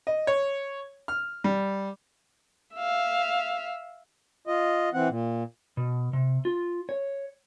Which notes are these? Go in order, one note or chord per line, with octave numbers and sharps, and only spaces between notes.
D#5
C#5
F6
G3
E5 F5
F4 D#5
E3 C4 F#5
A#2
B2
C3
F4
C#5